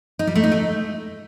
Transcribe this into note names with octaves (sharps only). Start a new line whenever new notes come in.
D#4
G3
A3
D#4
A3